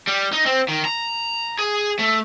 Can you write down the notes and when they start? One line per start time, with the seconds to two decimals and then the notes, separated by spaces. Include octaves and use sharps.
0.07 G3
0.33 D#4
0.46 C4
0.68 D#3
0.85 A#5
1.59 G#4
1.99 A3